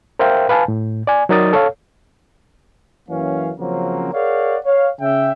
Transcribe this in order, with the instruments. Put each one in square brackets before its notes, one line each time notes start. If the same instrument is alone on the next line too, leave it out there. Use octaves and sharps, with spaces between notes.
[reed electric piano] A#4 C5 E5 F5 G5
B4 F5 G#5 A5
A2
D5 G#5
F#3 D#4 A#4 D5 D#6 A6
A4 C#5 F5
[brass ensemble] F#2 E3 A#3 C#4 F5
C#3 F3 F#3 A#3 C4 C#4
G#4 A#4 C#5 D5 F5 F#5
C#5 F5
C#3 E5 G5